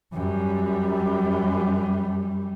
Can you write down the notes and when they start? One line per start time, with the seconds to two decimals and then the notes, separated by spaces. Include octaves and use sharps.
0.14 F#2 G3